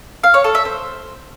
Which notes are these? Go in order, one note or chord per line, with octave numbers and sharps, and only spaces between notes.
F5
C#5
A4
E5
C5